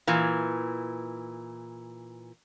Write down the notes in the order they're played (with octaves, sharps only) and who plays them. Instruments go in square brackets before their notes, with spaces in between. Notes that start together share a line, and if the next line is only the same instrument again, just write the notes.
[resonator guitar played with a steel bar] A#2 E3